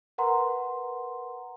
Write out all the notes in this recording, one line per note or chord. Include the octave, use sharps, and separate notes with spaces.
A#4 B4 F#5 A#5 C6